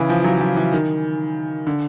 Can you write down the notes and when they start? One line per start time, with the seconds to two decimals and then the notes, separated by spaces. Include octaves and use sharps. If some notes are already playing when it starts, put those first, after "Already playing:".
Already playing: C#3 E3
0.09 F3
0.24 F#3
0.41 F3
0.57 E3
0.73 D#3
1.67 D3